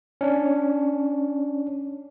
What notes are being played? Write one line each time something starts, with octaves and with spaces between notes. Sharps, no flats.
C#4 D4